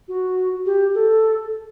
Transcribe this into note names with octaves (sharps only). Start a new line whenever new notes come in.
F#4
G4
A4